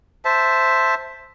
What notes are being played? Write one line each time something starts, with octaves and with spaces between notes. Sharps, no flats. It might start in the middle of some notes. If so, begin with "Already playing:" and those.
C5 E5 A5